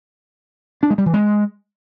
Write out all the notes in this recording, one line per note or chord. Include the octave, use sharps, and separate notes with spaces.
D4
G#3
G3
E3
G#3